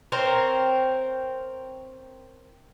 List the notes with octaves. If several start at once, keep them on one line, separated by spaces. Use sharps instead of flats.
C4 A#4 C5 C#5